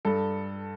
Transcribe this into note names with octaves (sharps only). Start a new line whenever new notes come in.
G2 A4